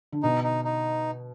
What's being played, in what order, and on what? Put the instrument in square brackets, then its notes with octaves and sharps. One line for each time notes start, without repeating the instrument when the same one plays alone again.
[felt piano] D3
[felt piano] B2 [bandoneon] D#4
[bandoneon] D#4
D#4